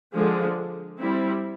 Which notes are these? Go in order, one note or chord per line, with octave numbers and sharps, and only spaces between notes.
D3 F3 G#3
G3 C4 E4